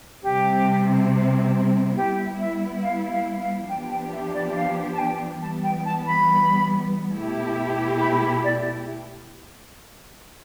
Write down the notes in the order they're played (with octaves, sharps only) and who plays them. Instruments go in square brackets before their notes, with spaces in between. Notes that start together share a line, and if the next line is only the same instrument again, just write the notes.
[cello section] C3 G3 C4 [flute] G4
[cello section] G3 B3 E4 [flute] G4
[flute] E5
F5
F5
F5
[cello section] F3 B3 D4 G4 [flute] G5
[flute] G5
E5
D5
E5
F5
A5
G5
[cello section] E3 G3 B3 [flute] A5
[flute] G5
A5
B5
[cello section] B2 A3 E4 G4
[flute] B5
B5
D5